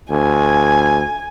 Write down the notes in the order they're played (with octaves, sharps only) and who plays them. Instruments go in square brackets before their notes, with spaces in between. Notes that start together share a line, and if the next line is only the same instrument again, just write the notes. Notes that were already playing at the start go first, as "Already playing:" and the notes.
[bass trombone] D2 [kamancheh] G#5